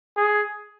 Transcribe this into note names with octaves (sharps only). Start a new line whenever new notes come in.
G#4